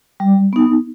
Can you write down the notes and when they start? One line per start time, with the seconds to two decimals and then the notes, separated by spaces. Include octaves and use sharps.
0.20 G3
0.53 B3 D#4